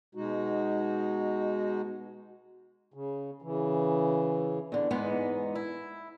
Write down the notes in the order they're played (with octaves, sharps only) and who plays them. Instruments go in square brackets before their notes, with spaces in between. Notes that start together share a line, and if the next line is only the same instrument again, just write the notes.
[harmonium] B2 G#3 D#4 F#4
C#3
C#3 E3
[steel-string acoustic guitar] E2 D3
E2 G#2 G#3 B3 D#4
E4